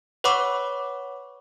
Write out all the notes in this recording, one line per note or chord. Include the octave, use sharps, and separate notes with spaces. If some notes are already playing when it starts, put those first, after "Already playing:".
B4 C#5 F#5 B5 C#6 D6